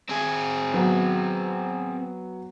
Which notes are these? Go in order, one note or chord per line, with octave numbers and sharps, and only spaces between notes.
C4 G#4
F#3 B3